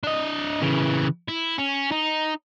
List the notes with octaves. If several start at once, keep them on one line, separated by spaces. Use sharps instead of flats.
D4 D#5
C#3 E3
E4
C#4
D#4